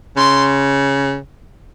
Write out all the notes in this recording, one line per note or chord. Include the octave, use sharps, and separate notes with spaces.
C#3 C6